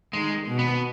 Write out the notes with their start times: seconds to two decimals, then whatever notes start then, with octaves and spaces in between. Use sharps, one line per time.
0.13 D#3 G#3
0.47 B2
0.59 B3